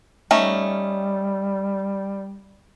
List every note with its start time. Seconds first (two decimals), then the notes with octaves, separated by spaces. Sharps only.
0.31 G3 A3 C#4 D#4